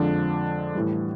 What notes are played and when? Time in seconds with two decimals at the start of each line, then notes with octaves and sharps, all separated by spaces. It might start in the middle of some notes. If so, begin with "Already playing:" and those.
Already playing: F2 D3 F3 G#3 D4
0.75 A2 E3 G3